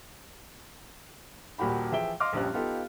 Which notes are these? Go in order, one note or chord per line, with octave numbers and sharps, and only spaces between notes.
D#1 A#2 F#4 G4 B5
E3 F3 G#4 E5 G5 G7
D#5 F5 C6 D6 F6
A#1 F#2 F3 G3 C#4 F#6
B3 D#4 F4 G4 A4 F5